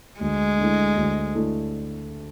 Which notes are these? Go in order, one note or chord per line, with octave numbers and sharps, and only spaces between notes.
D2 G#3
D3 A3 E4
D2
D3 A3 E4